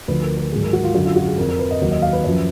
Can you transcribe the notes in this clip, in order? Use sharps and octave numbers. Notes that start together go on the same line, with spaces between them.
D2 D3 F3 B4
A#4
A#4
G#2 D#3 F#3 G#4
A#4
F#4
F4
F#2 D3 F#3 F#4
F4
F#4
G#4
F2 F3 A#4
A#4
B4
D#5
D#2 D#3 F#3
D#5
F5
B4
F#2 F3